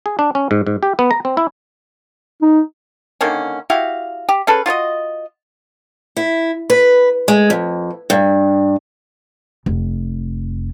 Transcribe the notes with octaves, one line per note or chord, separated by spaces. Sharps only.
G#4
D4
C#4
G#2
G#2
G4
B3
A#5
C4
E4
D#4
D3 D#3 A#3 C#4
E4 F#4 G4 F5
G4
C#4 G#4 A4 B4
F4 F#4 C#5 D#5
E4
B4
G#3
F2
G2
F1